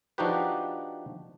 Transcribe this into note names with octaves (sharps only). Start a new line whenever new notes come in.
F3 D4 D#4 F#4 G4 B4